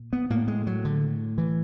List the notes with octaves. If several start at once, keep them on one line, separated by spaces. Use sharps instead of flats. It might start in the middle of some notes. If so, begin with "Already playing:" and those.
Already playing: A#2
B3
A2 A#3
G#3
F#3
D3
E3